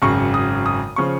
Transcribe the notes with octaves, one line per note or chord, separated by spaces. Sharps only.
G#1 F#2 C#3 C#6
D#6
D#6
C#3 F3 C#6